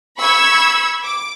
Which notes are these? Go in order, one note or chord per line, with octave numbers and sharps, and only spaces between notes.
B5 C#6 E6 G#6
D6